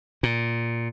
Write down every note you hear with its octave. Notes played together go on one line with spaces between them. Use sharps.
A#2